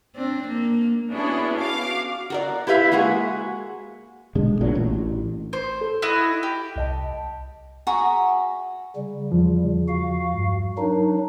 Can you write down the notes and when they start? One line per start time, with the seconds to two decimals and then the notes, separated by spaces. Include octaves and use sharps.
0.16 C4 D4
0.48 A#3
1.10 B3 C#4 D4 E4 F#4 G#4
1.59 F#4 F5 D6
2.30 F#4 A#4 D5
2.67 E4 G4 B4 E5 F5
2.92 G#3 A#3 F#4 G#4
4.35 B2 D3 G#3
4.61 B1 A#2 F#3 D4
4.75 A1
5.53 C5
5.81 A4
6.02 E4 F#4 D#5 D7
6.43 G4
6.76 C2 D#5 A5
7.87 F#4 G#4 E5 A#5
8.96 C#3 G3
9.32 E2 F3
9.88 F#4 F5
10.35 G2
10.78 F#3 D4 D#4 A#4